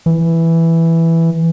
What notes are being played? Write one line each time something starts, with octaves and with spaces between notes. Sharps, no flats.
E3